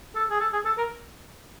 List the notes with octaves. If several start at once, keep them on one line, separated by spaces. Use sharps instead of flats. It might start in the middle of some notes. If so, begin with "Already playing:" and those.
A4
G#4
A4
G#4
A4
A#4